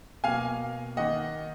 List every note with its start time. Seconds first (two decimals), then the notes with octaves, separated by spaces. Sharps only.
0.24 B2 A#3 F5 G#5
0.96 D#3 A#3 D#5 F#5